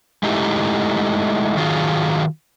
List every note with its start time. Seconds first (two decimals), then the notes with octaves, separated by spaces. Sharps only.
0.23 G#3 A3 D#4 E4 G4
1.57 D#3 F#3 F4 G#4